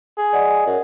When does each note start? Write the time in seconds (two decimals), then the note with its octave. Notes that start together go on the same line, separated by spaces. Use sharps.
0.18 G#4
0.33 D5 D#5 F#5
0.67 F#2